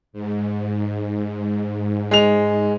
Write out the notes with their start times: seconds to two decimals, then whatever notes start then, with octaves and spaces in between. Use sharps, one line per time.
0.13 G#2
2.11 G#3 F7